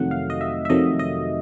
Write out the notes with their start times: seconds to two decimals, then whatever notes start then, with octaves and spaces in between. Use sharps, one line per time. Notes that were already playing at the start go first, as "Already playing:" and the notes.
Already playing: F2 C3 D#3 F#3 A3 F#5
0.11 F5
0.30 D#5
0.41 E5
0.65 E5
0.70 F2 C3 D#3 F#3 A3 D#5
0.99 D#5